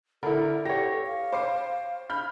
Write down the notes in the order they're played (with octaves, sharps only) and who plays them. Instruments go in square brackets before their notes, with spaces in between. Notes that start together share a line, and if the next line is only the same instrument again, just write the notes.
[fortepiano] D3 E4 [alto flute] A4 [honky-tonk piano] A#4
[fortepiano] G4 C#5 [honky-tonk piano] A#6
[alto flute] F5
[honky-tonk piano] C5 D6 C7
B5 F6 G6